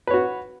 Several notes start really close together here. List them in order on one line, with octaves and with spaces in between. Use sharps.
B4 C#5 F#4